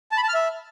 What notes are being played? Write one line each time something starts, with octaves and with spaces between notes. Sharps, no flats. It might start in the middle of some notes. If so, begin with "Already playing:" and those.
A5
B5
A5
F6
E5